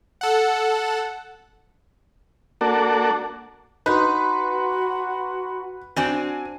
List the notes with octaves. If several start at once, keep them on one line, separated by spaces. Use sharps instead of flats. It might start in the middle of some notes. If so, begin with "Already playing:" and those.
A4 F#5
A#3 D4 F#4 A4
D#4 F#4 B4 A#5 C6
C4 D4 F#4 G#5